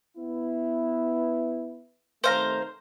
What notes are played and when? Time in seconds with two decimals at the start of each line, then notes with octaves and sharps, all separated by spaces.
0.16 B3 E4
2.24 C3 D#3 A3 C5 F5 A#5